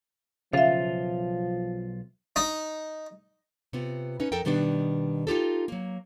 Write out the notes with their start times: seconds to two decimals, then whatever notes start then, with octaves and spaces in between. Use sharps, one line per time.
0.53 B1 C#3 F3 F4 E5 F5
2.36 D#4
3.73 C3 B3 F4
4.20 C#4 D#4 B4
4.32 F2 A4 A#4 G5
4.45 B2 D#3 G3 B3 D4
5.27 D#4 F4 G4 A4
5.68 F#3 A#3